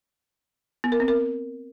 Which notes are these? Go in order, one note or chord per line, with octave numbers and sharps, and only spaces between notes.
B3
A#4
C4
A#4